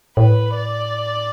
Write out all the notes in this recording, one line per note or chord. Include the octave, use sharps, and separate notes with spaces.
A2 B4
D5